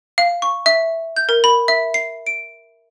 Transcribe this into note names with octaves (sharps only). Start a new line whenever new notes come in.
F5
C#6
E5
G6
A#4
B5
E5
C7
D7